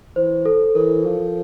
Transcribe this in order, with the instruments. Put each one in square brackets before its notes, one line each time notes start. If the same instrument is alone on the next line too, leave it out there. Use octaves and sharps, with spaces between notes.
[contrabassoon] E3 [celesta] C5
[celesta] A4
[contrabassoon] E3 [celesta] A#4
[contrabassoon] F3